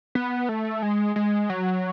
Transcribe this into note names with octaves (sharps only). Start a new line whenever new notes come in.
B3
A3
G#3
G#3
F#3